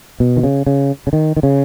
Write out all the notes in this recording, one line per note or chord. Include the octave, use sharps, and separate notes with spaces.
B2
D#3
C#3
C#3
C#3
D#3
D#3
C#3